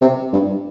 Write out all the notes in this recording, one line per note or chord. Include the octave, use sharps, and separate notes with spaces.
C3
G2